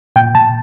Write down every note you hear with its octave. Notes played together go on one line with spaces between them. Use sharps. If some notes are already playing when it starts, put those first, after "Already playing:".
A#2 G5
A#2 A5